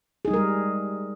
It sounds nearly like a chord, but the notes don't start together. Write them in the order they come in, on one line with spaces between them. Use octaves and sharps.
G#4 D#4 G3 A#4 G#3